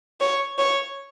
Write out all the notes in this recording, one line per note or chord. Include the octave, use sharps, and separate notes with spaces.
C#5
C#5